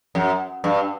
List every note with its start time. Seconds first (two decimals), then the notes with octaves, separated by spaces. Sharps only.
0.15 F#2
0.64 G2